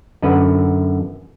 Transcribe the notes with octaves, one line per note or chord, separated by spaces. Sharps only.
F#2 D3 B4 F#5